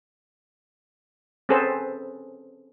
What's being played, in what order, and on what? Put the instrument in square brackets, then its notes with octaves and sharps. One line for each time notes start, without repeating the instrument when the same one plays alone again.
[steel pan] C4 C#4 G#4 A4 B4 C5